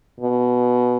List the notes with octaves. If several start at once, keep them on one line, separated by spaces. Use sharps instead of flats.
B2